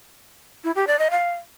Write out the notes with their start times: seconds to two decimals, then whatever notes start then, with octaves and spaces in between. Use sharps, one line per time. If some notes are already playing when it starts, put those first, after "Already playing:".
0.64 E4
0.76 G4
0.87 D5
0.99 D#5
1.10 F5